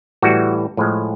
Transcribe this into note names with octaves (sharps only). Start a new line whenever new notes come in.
A2 E3 G3 F#4
A2 F3 G#3